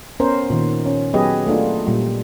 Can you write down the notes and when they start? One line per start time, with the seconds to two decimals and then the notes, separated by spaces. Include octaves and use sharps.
0.20 B3 C#4 A#4 C5
0.50 A#2 D#3
0.86 C#4
1.14 F#3 B3 G4 G#4 B4 D#5
1.47 A3 A#3 D4 F4
1.87 A#2 G3